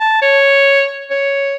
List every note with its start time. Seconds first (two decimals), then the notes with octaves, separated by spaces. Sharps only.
0.01 A5
0.22 C#5
1.10 C#5